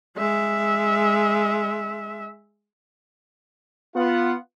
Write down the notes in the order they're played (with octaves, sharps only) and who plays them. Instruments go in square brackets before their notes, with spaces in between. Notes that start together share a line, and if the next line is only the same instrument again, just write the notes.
[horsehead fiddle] G#3 E5
[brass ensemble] B3 F4 F#5